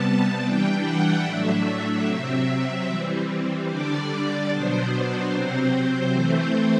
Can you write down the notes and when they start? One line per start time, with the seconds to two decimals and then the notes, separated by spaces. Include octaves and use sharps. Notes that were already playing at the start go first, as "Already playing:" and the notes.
Already playing: C3 G3 B3 A5
0.42 E3 G3 D4 G5
0.83 F#5
1.24 A2 F#3 A3 D4 E5
2.06 C3 F#3 C4
2.86 E3 G3 C4
3.68 D3 G3 D4 D5
4.49 B2 F#3 B3 D4 C5
5.31 C3 F#3 C4
6.12 E3 A3 C4